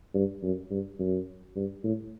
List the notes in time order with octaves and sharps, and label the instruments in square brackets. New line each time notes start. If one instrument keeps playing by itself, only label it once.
[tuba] G2
F#2
G2
F#2
G2
A2